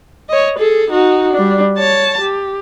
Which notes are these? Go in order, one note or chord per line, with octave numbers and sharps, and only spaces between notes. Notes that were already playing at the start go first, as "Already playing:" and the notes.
C#5 D#5
G#4 A4
D#4 F#4
G3 D4
C#5 A5
G4